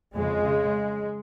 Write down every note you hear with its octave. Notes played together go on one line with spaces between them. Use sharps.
F2 C#3 G#3
C#3